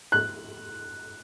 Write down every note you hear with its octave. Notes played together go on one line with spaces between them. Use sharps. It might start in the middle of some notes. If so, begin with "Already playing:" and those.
F#6